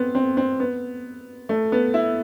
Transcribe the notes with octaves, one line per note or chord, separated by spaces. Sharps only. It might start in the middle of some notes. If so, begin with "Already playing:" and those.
Already playing: B3 C4
C4
C4
B3
A3
B3
E4